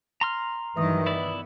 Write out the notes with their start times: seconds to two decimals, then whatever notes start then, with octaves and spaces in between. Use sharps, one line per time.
0.21 A#5 C6 F6
0.76 G2 D#3 E3 F#3 B4 E5 D#6
1.07 B3 E4 D5